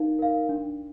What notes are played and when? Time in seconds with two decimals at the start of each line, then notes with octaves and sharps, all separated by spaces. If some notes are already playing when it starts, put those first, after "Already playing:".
Already playing: D#4 A#4 F5
0.19 A#4 F5
0.49 D4